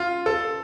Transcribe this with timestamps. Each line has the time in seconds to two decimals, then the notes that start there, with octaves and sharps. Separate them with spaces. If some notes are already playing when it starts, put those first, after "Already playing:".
Already playing: F4
0.26 A4